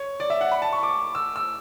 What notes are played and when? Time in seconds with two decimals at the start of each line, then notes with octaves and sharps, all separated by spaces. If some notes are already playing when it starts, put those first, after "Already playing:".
Already playing: C#5
0.20 D5
0.30 E5
0.41 F#5
0.51 B5
0.62 A5
0.73 C#6
0.83 D6
1.15 E6
1.36 E6